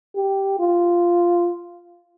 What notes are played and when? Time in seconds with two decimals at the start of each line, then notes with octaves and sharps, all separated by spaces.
0.16 G4
0.60 F4